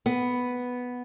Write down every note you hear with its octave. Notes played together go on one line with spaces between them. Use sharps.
B3